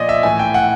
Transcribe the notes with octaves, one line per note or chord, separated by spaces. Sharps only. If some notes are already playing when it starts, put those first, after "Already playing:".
Already playing: A#2 F3 D5 D#5
E5
A2 E3 G#5
G5
F#5